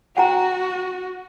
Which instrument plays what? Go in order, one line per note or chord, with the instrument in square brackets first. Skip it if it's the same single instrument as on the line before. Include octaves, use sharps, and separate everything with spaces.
[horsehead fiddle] F#4 [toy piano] F#5 G5 A#5